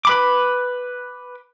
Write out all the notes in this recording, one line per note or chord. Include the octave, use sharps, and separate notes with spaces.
B4 B5 D6